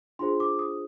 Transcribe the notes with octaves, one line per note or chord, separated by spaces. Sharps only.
D4 F4 G#4 C5 C6
D6
D#6